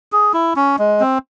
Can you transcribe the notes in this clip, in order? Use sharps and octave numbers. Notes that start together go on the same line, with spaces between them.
G#4
E4
C#4
G#3
C4